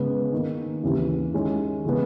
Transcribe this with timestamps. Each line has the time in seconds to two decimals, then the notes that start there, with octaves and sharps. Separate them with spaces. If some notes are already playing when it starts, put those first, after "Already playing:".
Already playing: C#3 G#3 B3
0.32 D#3 A#3 D#4
0.83 D#2 C#3 E3
1.33 D#3 G#3 C#4 E4
1.85 C#3 E3 G#3 B3